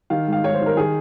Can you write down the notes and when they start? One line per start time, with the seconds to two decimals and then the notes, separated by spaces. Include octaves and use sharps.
0.10 D#3 F5
0.27 G#2
0.32 F5
0.44 G#2 C#5
0.54 C5
0.61 D#3
0.66 A#4
0.77 D#3 G#4